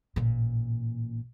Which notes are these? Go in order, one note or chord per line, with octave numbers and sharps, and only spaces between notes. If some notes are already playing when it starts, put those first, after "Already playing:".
A1 A#2